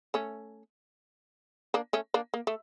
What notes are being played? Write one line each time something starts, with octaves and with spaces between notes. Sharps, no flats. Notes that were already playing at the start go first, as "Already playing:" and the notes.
A3 C#4
A#3 D4
A3 C#4
A#3 D4
A#3
A3